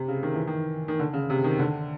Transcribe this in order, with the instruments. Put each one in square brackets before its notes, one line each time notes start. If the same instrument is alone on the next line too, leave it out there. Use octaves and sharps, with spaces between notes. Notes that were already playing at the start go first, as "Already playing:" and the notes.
Already playing: [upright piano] C3
C#3
D#3
E3
D#3
D#3
D3
C#3
C3
D#3
D3